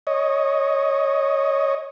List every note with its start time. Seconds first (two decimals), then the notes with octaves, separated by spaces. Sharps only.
0.07 C#5 D#5